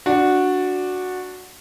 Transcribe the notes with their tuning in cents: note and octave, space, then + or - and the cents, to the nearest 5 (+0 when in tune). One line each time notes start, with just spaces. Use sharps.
D4 +0 F#4 -10